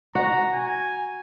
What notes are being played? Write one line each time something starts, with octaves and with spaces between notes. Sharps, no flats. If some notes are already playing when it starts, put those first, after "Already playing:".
F#4 A#5
G#5